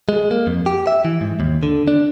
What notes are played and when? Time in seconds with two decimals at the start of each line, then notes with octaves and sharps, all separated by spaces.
0.09 G#3
0.31 A#3
0.47 F2
0.66 G4
0.87 E5
1.05 E3
1.21 G#2
1.40 D#2
1.63 D3
1.88 D4